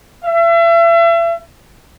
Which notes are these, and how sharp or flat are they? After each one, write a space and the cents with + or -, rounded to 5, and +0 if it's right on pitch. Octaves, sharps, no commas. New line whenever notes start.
E5 +40